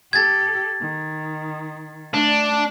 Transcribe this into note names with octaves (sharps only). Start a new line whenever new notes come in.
G4 A4 G#6 A6
D#3
A3 D4